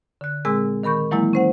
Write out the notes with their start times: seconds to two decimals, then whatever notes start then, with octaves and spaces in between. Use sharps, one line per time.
0.21 D3 F#6
0.45 A#2 G#3 C4 G#4 G#5 E6
0.83 D#3 A#4 B5 C#6 G6
1.11 E3 F#3 G#3 A#3 E4 G#5
1.33 C#4 C5 F#5